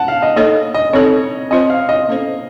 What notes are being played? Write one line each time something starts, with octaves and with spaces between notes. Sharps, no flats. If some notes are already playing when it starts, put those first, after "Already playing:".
Already playing: F#5 A5
F5
D#5
A#3 D#4 A4 C#5 D#5
D#5
C4 D#4 A4 C#5
C4 F4 C5 D#5
F5
D#5
A#3 C#4 A4 C5